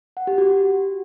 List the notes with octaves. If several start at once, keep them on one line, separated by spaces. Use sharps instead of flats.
F#5
G4
F#4